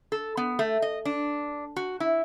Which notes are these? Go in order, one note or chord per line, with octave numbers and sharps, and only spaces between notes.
A4
B3
A3
D#5
D4
F#4
E4